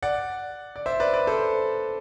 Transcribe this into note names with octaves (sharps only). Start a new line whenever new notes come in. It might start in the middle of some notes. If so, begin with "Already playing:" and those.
D5 F#5
D5
C5 E5
B4 D5
B4 D5
A4 C5